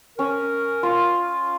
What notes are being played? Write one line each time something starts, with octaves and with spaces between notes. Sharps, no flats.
C#4 A#4
F4